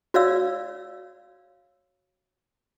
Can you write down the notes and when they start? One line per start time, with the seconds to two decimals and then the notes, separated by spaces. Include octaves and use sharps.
0.14 F#4 C#5 D5 F5 E6